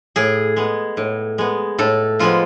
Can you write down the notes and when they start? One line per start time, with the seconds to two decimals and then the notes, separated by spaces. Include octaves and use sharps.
0.16 A2 G#4
0.56 G#3 B3
0.97 A2
1.38 G#3 B3
1.79 A2 A4
2.19 F3 G#3 B3 F4